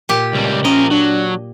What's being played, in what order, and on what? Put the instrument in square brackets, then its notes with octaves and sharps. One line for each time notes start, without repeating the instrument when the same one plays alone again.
[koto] A#2 G4
[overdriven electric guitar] C#2 G3
[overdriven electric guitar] F3 A#4 [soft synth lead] C#4 [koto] D#5
[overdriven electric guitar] F#3 [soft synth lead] D4